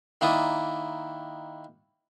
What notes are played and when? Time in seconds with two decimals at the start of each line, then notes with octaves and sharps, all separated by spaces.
0.21 D#3 A#3 D4 E4 D#6